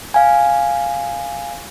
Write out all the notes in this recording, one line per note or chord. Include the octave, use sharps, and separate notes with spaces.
F5 G#5